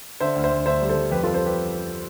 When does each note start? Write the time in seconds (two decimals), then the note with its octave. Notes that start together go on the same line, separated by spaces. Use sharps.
0.20 D3 C5 E5
0.36 D2
0.44 C5 E5
0.51 D2
0.66 D2 C5 E5
0.82 G3
0.89 A4 C5
0.96 G3
1.11 F2 G4 B4
1.23 F4 A4
1.27 F2
1.34 A4 C5
1.46 G4 B4